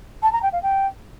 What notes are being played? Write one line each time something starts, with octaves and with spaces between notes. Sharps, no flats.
A5
A#5
G5
F5
G5